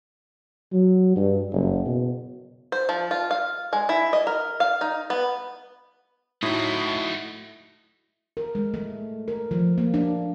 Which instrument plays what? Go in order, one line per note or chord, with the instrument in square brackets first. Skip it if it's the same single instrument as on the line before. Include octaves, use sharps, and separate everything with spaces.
[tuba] F#3
G2
F#1
B2
[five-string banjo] C5
F3
F4
F5
G#3
E4
D#5
A#4
F5
D#4
B3
[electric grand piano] A2 [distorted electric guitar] A3 D#5 [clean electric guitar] D#4 E4 F#4
[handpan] A#4
G#3
A3
A#4
F3
A#3
D4